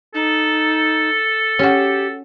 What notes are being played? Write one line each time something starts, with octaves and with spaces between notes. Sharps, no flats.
D#4 A4
C#4 F#4 G4